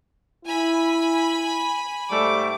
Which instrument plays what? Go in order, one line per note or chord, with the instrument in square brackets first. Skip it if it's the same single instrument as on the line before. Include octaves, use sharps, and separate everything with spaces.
[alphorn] E4 [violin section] G#5 B5
[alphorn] G#2 [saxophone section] G3 A3 [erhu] D6